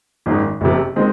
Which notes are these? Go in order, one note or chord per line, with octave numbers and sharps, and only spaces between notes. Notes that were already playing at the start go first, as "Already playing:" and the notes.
G#1 F#2 D#3 G#3 D#4
F#1 F2 C3
D#3 G#3 C4